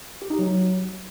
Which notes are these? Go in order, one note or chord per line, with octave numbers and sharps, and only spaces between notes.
G4
D#4
F#3